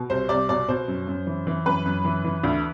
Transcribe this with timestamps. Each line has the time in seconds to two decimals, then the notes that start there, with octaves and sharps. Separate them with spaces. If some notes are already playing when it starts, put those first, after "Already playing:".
Already playing: B2
0.10 C2 C5
0.29 C2 D5
0.49 B2 D5
0.69 B2 C5
0.88 F#2
1.08 F#2
1.27 E3
1.47 E3
1.66 F#2 B4
1.86 F#2
2.05 E3
2.24 E3
2.43 D2